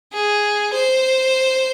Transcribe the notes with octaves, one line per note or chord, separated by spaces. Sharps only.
G#4
C5